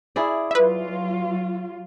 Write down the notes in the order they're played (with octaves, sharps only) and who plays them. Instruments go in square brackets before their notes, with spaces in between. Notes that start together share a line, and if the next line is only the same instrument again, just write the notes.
[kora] E4 G#4 D5
[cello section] F#3 F4 [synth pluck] B4 E5